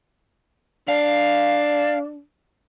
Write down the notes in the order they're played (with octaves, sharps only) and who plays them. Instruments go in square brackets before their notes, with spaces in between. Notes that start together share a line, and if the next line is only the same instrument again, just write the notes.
[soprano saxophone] D4 [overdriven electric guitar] F5